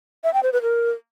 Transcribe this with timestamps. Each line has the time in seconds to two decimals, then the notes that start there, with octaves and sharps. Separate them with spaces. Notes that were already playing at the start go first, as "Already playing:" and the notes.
0.24 E5
0.33 G5
0.43 C5
0.53 B4
0.62 A#4